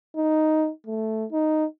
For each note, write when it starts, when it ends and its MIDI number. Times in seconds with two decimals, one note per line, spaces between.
0.16 0.70 63
0.87 1.25 57
1.32 1.65 63